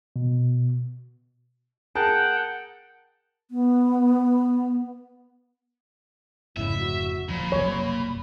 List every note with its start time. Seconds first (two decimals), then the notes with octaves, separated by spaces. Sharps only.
0.16 B2
1.95 G#4 A#4 F#5 G5 A5
3.51 B3
6.57 F1 G#2 C#3 E4 E5
6.79 F#4
7.29 D1 A#2 F3 B5
7.52 F#1 C2 F#3 C#5